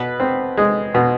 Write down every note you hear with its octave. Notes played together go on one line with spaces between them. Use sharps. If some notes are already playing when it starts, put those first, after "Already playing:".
Already playing: B2 B4
C4
G#3
B2